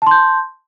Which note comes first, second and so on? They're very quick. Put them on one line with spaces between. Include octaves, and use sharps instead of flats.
A5 C6 G6